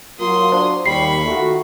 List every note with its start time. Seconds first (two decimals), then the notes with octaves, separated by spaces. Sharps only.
0.19 F#3 A#3 F4 C6 D#6
0.52 D4 C5
0.86 D#2 G3 B5 C#6 C7
1.26 D#3 A3 F4 F#4